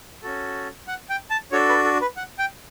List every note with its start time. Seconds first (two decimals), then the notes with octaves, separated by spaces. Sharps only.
0.23 C#4 F#4 A4
0.88 F#5
1.10 G5
1.30 A5
1.52 D4 F#4 A4 C#5
1.69 B4
1.84 A4
2.01 B4
2.17 F#5
2.39 G5